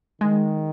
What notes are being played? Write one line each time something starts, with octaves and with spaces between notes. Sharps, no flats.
D#3 G#3